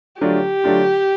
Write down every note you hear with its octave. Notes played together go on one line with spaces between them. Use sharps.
D3 F#3 A3 D4 F4 G4
D3 F#3 A3 D4 F4